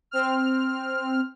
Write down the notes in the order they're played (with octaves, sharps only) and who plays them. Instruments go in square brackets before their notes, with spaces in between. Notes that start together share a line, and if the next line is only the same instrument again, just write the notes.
[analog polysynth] C4 F6